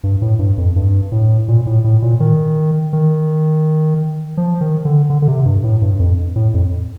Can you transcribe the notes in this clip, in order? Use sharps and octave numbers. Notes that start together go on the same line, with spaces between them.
G2
A2
G2
F2
G2
A2
A#2
A2
A2
A#2
D#3
D#3
F3
D#3
D3
D3
D3
C3
G2
A2
G2
F2
A2
F2